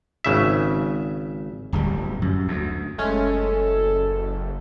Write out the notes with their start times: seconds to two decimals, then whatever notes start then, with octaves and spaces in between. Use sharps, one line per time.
0.24 G#1 C#3 E5
1.73 D1 G1 G3
2.22 F#2
2.48 D2
2.98 F#1 G#3 A3 C#4 A4